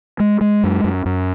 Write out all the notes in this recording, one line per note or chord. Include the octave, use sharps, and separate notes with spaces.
G#3
G#3
F#2
F#2
F#2